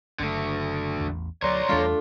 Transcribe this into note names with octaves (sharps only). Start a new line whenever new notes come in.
F#1 D3 A3
A1 E2
D2 F#3 B4 C#5 D5 A#5 C6
E2 G3 A3 D4 F4